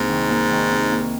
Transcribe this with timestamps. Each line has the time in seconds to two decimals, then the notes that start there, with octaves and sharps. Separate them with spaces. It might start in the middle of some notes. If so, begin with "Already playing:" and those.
Already playing: C2 G#2 C3 A#3
0.09 D#3
0.30 A#3
0.51 D#3
0.72 C3
0.92 A#3